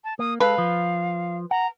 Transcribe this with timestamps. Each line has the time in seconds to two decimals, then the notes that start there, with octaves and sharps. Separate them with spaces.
0.04 A5
0.19 A#3 D#6
0.40 G#3 A4 B4 F5
0.58 F3
1.51 F#5 A#5